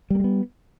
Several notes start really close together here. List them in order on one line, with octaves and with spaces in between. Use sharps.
G3 A#3 G#3 B3